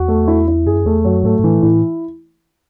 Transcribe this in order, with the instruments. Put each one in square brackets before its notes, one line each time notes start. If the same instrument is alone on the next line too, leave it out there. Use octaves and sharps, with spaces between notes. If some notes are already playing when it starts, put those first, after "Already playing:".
Already playing: [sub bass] E2 [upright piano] F#4
[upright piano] A3
E4
E4
[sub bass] F#2 [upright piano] G#4
[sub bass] E2 [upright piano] A3
[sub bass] F#2 [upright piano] F#3
[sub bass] G#2 [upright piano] A3
[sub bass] G#2
[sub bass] A2 [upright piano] E3
[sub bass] A2 [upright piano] E4